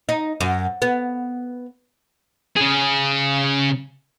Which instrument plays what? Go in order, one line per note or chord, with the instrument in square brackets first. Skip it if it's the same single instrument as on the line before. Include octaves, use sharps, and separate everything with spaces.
[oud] D#4
F#2
B3
[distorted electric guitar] C#3 G#4